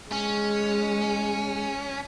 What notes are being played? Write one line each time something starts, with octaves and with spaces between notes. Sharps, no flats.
G#3 C#4